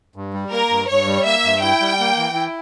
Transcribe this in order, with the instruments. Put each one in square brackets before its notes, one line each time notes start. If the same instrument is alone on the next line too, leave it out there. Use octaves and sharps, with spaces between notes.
[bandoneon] G2
G3
[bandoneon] A#3 [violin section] A#4
[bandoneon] G2
[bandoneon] G2 [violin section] C#5
[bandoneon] G3
[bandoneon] A#3 [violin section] E5
[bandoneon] G2
[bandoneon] E4 [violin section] G5
[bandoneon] G3
A#3
E3
E4